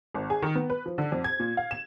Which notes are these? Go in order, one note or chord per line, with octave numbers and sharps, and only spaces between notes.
G#1
G#4
D#3
B3
B4
F3
D3
F2
G#6
A#2
F5
E7